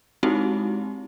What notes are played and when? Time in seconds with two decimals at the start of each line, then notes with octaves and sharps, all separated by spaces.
0.23 G#3 C4 D#4 E4 F#4 G4